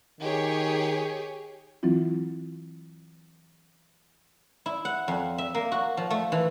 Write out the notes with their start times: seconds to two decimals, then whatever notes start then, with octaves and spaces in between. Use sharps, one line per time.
0.20 D#3 G4 G#4 C#5
1.83 E3 F#3 C4 E4 F4
4.66 E4
4.85 F#5
5.08 F2
5.38 E5
5.55 A#3
5.72 F#4
5.97 F3
6.10 A3
6.32 E3